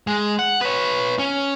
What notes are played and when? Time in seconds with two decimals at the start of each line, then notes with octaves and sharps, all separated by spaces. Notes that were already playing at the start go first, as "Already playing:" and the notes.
0.07 G#3
0.39 F#5
0.61 B4 C#5
1.19 C#4